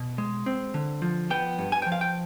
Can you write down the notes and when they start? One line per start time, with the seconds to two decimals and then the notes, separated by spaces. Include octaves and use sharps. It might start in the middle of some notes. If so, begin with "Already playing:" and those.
Already playing: B2
0.18 G#3
0.46 C4
0.74 D3
1.02 F3
1.30 B3 G5
1.59 G2
1.72 G#5
1.82 G5
1.86 F3
1.92 F5
2.01 G5